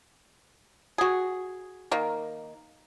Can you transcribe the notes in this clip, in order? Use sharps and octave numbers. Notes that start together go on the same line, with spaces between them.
F#4 G#4
D#3 A#3